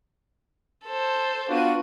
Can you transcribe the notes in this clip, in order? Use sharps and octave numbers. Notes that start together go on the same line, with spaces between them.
A4 C5
B3 D4 F4 F#4 D#7